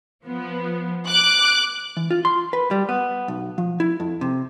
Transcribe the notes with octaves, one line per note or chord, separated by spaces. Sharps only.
F3 B3
D6 F#6
E3
F4
C6
B4
G3
B3
B1
F3
E4
F2
C3